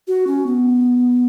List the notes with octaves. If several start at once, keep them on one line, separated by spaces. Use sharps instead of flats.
F#4
C#4
B3